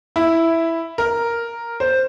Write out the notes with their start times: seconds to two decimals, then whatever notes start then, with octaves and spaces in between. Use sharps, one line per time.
0.16 E4
0.98 A#4
1.80 C5